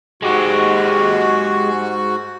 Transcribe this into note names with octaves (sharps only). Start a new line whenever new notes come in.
G#2 G#3 F#4 G4